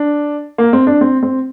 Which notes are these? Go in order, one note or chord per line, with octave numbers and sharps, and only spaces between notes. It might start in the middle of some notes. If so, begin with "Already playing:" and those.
Already playing: D4
A#3
C4
D4
C4
C4